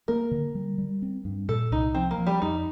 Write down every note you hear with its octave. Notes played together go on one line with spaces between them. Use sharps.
A#3 A#4
D3
G3
G3
C4
G2
A#2 A4
C2 D#4
F3 C4
A#3
F3
G3
F2 D#4